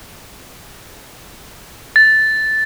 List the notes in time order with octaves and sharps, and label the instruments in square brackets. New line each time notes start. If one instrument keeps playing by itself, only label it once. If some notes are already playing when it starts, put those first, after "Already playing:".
[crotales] A6